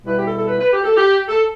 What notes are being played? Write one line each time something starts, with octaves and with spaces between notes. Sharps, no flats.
B2 G3 E4 B4
G4
A4
A4
B4
B4
G4
A4
G4
A4